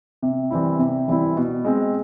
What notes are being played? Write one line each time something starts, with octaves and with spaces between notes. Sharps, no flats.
C3
E3 G3 C4 E4
C3
E3 G3 C4 E4
B2
G#3 C4